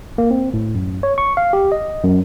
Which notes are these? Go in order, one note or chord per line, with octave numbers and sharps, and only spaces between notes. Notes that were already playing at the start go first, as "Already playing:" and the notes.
A#3
C4
A2
F#2
C#5
C#6
F5
G4
D#5
F#2